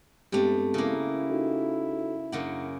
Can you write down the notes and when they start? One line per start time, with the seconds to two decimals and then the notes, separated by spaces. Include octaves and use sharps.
0.32 G2 G#3 A3 B3 C4 G4
0.74 C#3 A#3 E4
1.30 D#4 F#4 A4
2.32 F#2 C#3 A#3 D4 F#5